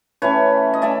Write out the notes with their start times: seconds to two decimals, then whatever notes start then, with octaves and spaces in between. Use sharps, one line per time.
0.22 E3 A3 C#4 B4 C#5
0.74 D#5
0.82 E3 A3 C#4 D5 E5